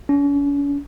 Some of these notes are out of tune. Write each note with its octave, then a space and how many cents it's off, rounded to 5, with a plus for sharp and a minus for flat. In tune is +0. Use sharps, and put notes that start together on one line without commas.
C#4 +40